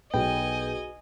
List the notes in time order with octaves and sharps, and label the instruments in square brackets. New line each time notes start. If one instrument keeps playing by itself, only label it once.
[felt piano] B1 [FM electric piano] F#4 G#4 B4 [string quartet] D#5 G#5 [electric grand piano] G5